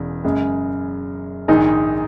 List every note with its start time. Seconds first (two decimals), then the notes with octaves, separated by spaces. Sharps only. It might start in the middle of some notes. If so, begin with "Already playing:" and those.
Already playing: E1 E2 C#3
0.24 F#2 C#3 G#3
1.48 A#1 G#2 D#3 G#3 D#4